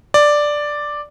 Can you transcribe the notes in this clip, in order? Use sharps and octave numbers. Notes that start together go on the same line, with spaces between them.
D5